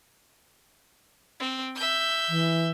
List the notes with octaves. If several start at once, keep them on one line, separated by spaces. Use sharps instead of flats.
C4
E5 G6
E3